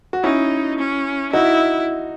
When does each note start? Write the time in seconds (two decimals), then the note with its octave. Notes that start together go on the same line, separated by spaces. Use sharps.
0.13 F#4
0.23 C#4 D#4 E4
0.78 C#4
1.33 D#4 E4 F#4